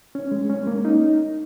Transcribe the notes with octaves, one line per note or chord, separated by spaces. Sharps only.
C#4
G#3
C#4
A#3
D#4